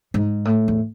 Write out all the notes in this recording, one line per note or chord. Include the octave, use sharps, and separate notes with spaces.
G#2
A2
E2